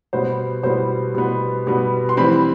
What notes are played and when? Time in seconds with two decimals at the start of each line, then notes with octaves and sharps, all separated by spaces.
0.13 B2 G3 B3 C5
0.63 B2 G3 B3 C5
1.14 B2 G3 B3
1.67 B2 G3 B3
2.09 C6
2.17 E3 G3 C4 B5